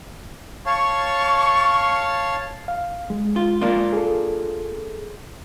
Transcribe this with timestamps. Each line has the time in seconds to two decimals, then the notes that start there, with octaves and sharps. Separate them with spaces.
0.66 C#5 F5 A5 C#6
2.68 F5
3.10 G#3
3.36 F4
3.61 A#3 D4 F4
3.93 G#4 A4